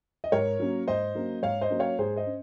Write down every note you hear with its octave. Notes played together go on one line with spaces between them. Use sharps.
D#5
G#2 A#4 C#5
F#3 A#3 C#4
G#2 C5 D#5
F#3 A#3 C#4
G#2 C#5 F5
C5 D#5
F#3 A#3 C#4
C#5 F5
G#2 G#4 C5
C5 D#5
C#4